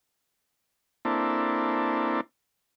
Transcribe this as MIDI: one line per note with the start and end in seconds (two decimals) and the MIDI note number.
1.05 2.21 58
1.05 2.21 60
1.05 2.21 62
1.05 2.21 64
1.05 2.21 69